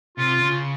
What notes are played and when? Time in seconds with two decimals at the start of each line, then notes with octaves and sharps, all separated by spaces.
0.17 C3 F4
0.39 C#3